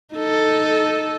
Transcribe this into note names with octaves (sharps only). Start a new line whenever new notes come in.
D#4 A4